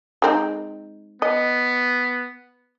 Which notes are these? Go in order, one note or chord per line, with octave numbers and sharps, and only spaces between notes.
G#3 C4 D#4
B3 D#5